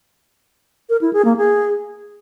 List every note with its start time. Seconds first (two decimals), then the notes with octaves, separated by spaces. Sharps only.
0.90 A#4
1.01 E4
1.13 G#4
1.25 A#3
1.37 G#4